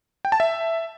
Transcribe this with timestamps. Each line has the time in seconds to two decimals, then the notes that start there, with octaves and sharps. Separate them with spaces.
0.25 G5
0.32 A5
0.40 E5